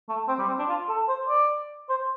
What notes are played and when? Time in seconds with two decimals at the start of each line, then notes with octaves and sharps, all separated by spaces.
0.08 A3
0.28 C4
0.38 G3
0.48 C4
0.58 D4
0.68 F4
0.89 A4
1.08 C5
1.29 D5
1.89 C5